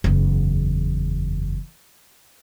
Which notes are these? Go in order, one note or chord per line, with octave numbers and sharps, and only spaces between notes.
F#1 E2